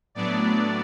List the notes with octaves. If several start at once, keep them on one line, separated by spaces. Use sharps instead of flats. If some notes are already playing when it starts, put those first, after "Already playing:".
A2 F#3 B3 D4 D5